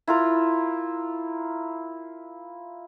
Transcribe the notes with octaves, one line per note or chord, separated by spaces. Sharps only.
E4 F4 A#4